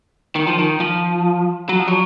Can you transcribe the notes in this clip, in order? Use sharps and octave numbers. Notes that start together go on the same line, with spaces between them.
D#3
F3
D#3
F3
F#3
F3
F#3